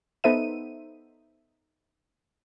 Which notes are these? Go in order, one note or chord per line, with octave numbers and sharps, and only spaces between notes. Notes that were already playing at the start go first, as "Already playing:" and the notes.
B3 D#4 A4 C5 E5 D#7